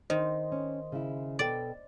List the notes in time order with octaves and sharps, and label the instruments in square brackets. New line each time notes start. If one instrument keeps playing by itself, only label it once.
[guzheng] D#3 [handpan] C5 D#5
[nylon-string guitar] C#4
C#3 E4
[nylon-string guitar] B2 A4 G5 [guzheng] D5